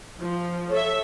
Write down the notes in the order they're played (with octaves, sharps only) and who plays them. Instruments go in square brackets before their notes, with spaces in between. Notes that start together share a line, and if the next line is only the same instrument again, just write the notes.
[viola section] F3
[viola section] A4 E5 [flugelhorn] C#5